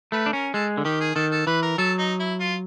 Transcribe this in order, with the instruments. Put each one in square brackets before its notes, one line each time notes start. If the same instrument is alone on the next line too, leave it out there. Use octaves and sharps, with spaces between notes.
[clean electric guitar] A3 [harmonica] B4
[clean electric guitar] D4
[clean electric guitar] C#4 [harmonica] A#4
[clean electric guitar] G#3 [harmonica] A4
[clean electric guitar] D3
[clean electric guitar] D#3 [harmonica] G4
[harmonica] G#4
[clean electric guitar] D#3 [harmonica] A4
[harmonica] A4
[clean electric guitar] E3 [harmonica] B4
[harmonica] A#4
[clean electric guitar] F#3 [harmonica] A4
[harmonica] D#4
E4
F4